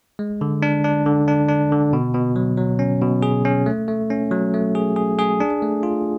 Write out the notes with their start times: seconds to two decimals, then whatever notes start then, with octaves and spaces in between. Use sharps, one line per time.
0.19 G#3
0.41 D3
0.62 D4
0.84 D4
1.06 D3
1.28 D4
1.49 D4
1.72 D3
1.93 B2
2.14 B2
2.36 F#3
2.58 F#3
2.79 C#4
3.02 B2
3.23 G#4
3.45 C#4
3.66 A3
3.88 A3
4.10 C#4
4.31 F#3
4.54 A3
4.75 G#4
4.96 G#4
5.19 G#4
5.40 D4
5.62 A3
5.83 F4